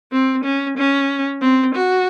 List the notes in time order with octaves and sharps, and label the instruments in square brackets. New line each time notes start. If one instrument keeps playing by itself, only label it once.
[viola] C4
C#4
C#4
C4
F#4